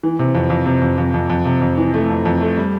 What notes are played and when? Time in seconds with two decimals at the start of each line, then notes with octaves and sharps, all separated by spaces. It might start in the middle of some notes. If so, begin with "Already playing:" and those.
0.03 E3
0.19 C3
0.35 F2
0.50 F2
0.66 C3
0.82 F2
0.98 F2
1.14 F2
1.30 F2
1.46 C3
1.61 F2
1.78 E3
1.94 A3
2.10 F2
2.25 F2
2.41 A3
2.57 G3